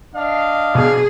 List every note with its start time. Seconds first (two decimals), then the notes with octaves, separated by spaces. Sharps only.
0.15 D4 D#5 F5
0.75 B2 D4 G#4